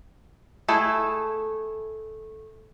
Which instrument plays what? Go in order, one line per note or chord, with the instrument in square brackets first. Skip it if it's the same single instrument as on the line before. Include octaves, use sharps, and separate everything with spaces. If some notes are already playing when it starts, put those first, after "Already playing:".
[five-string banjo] A3 E4 G#4 A4